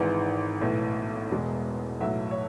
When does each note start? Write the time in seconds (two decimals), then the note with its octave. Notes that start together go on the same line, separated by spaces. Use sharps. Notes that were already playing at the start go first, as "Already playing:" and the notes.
Already playing: G#1 G#2 E3
0.61 B1 A2 E3
1.30 E1 E2 B2 G#3
2.00 B1 A2 F#3 E5
2.31 C#5